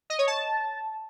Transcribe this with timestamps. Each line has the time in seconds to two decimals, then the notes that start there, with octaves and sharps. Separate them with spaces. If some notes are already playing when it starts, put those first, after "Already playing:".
0.10 D#5
0.19 C#5
0.27 A5